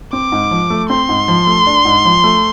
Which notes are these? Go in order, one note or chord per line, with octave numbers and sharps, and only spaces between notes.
C4 D6
G#2
F3
A3
C4 C6
G#2
F3
A3
D4
G#2
F3
A3